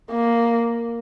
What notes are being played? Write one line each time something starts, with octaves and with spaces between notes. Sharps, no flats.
A#3